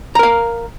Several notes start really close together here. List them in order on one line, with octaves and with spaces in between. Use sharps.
A#5 A#4 F5